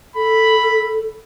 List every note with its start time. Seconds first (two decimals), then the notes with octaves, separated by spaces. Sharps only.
0.16 A4 B5